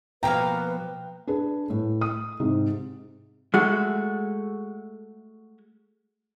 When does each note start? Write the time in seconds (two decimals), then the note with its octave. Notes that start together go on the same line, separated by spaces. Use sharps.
0.23 B2 F3 A#3 B4 F5 G5 A#5
1.27 D4 G#4 B4
1.70 A2
2.01 D#6
2.40 G#2 C3
3.54 G#3 A3 F#4